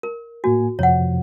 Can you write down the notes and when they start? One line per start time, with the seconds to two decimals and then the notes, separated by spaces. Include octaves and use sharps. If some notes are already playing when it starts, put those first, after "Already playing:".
0.03 A#4
0.44 A2 A#3 F#4 G#5
0.79 F2 C3 F3 C#5 F#5